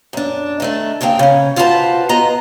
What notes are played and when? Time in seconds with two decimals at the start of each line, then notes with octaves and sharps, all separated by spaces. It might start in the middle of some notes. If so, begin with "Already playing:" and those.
0.13 F#2 D4
0.60 D#3 A3 D4
1.01 D2 C#3 A#3 C4 G5
1.19 C#3 C#4
1.56 D#2 F4 F#4 B4 C5 A5
2.09 B3 F4 D#5 A#5